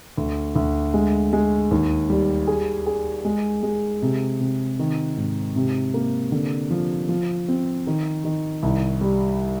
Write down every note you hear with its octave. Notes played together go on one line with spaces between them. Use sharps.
D2
D2
G#3
G#3
D#2
G3
G#4
G#4
G#3
G#3
C3
C3
D#3
G#2
C3
A#3
D3
F3
F3
C4
D#3
D#3
C2
G3